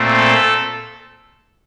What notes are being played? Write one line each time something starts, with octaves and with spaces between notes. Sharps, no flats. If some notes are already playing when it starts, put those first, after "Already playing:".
Already playing: A#2 A3 C4
A4